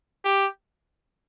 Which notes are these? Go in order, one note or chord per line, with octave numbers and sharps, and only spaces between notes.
G4